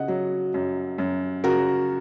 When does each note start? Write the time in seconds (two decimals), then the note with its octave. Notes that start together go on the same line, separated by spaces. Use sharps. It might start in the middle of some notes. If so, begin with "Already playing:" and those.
Already playing: C#3 D#5 F#5
0.08 F#3
0.54 F#2
0.98 F#2
1.44 C#3 F#4 A#4